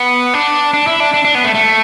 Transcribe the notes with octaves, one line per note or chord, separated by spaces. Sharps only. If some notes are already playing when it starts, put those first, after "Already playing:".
Already playing: B3
D4
D4
E4
D4
D4
D4
B3
A3
A3